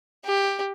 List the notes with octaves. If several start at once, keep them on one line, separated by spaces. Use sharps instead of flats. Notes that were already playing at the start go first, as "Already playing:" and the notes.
G4